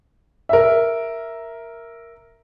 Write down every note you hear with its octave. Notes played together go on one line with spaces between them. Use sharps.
A#4 E5